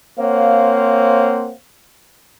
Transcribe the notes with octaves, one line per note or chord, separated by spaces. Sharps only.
A#3 C4 C5 C#5 F5 F#5